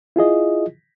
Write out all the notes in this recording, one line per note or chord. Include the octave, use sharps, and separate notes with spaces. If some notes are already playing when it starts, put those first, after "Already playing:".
E4 F4 G#4 D#5